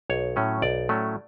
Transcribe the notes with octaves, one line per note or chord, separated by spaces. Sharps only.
B1 C#5
A2 F#3 A3 C#4
B1 D5
A2 F#3 A3 C#4